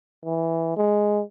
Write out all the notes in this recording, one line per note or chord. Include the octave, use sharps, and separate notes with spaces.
E3
G#3